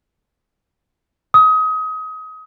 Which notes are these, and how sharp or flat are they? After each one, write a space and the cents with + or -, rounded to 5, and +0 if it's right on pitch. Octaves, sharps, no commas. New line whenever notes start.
D#6 +25